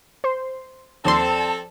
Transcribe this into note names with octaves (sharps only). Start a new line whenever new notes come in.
C5 C6
D#2 F3 C4 A4 C5 D5 A5 C6